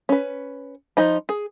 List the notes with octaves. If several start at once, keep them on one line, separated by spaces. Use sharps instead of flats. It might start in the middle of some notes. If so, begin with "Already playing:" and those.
C#4 B4
F3 D#4 B5
G#4